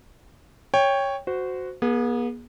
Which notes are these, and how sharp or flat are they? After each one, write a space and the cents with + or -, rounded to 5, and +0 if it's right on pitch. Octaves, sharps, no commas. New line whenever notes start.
C#5 +0 G5 +15
F#4 +0 C5 -20
B3 -45 G#4 +0